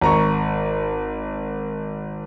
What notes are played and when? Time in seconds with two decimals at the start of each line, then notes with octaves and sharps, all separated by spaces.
0.01 G#1 A#5 C#6